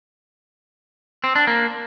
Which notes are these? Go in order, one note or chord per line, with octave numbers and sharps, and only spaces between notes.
C4
D4
A#3